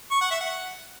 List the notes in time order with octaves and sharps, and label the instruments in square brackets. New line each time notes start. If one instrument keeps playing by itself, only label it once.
[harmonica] C#6
F#5
E5
F#5